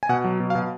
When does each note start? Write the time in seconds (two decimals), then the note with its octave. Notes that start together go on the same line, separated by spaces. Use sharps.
0.03 G#5
0.09 B2 F#5
0.24 F#3
0.40 B2
0.50 F5
0.55 B2